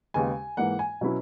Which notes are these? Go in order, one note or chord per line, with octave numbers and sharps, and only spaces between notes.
D#2 C#3 G#3 B3 G#5
G#2 E3 A#3 F#5
G#5
B2 F#3 C#4 E4